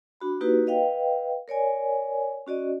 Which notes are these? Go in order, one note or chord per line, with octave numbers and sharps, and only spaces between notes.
D4 F#4 B5
A#3 D#4 E4 F#4 G4 B4
B4 D#5 F5 G5
A#4 C#5 D5 G#5
C#4 F#4 D5 D#5